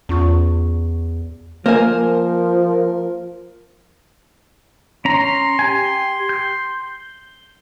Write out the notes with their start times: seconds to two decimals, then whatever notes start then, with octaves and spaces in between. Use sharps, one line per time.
0.09 E2 C#4 F4 C#6
1.66 F3 A#3 A#4 C5 G#5
5.05 C#4 A#5 C6
5.59 G4 G5 G#5
6.29 G6